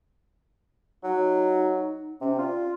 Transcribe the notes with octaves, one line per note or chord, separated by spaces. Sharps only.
F#3 D#4
C3 C#4
F4 D5